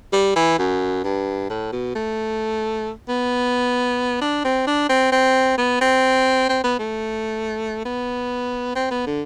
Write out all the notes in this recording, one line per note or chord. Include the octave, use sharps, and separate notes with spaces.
G3
E3
F#2
G2
A2
B2
A3
B3
D4
C4
D4
C4
C4
B3
C4
C4
B3
A3
B3
C4
B3
D3